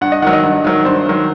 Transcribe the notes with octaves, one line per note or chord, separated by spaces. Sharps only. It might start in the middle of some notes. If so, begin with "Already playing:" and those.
G2 F#5
D#5
D#3 F#3 F#5
D#5
G2
D#3 F#3
G2 C5
D#3 F#3